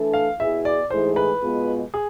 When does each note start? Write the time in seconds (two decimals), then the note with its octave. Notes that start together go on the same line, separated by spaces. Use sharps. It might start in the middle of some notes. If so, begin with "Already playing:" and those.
Already playing: E3 A3 D4 A4
0.14 F5
0.39 B2 B3 E4 G#4 E5
0.65 D5
0.90 G#2 E3 A3 E4 G#4 C5
1.16 B4
1.42 B2 G#3 B3 F4 G#4
1.94 G#4